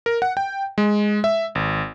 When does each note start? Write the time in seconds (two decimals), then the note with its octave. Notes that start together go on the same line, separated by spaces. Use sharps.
0.06 A#4
0.22 F#5
0.37 G5
0.78 G#3
1.24 E5
1.55 G#1